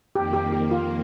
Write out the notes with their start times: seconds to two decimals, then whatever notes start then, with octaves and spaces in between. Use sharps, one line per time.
0.15 F2 D#3 A#3 G4
0.33 G4
0.53 G4
0.71 F4